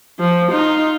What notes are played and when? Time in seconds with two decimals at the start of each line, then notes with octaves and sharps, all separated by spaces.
0.20 F3
0.50 D#4 F4